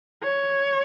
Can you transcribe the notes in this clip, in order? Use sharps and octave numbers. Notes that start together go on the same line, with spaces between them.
C#5